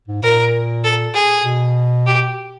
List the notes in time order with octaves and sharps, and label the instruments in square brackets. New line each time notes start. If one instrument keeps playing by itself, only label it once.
[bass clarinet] G#2
[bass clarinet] A#2 [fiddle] A#4
[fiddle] A4
G#4
[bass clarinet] B2
[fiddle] G4